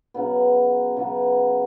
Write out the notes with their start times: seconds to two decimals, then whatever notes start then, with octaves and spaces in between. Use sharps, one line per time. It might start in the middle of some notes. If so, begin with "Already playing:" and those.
0.14 C#3 F#3 B3
0.96 C#3 F#3 B3